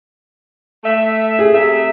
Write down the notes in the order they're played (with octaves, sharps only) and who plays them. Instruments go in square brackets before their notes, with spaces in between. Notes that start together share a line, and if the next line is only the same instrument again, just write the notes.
[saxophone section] A3 E5
[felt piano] G#4
[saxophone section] C3 A3 E5